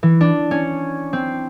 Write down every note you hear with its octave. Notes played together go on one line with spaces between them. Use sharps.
E3
D4
C#4
C4